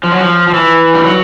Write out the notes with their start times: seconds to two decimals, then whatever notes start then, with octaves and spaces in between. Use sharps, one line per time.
0.03 F3
0.12 F#3
0.21 F3
0.48 F3
0.54 E3
0.94 G3
1.04 F#3